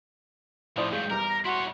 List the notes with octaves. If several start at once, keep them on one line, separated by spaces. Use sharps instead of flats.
A2 F3 E4 C5 D5 D#6
G2 F#3 G#3 F5 G6
E2 G3 A#4 A#5
A#6
E4 F#4 C#5 C6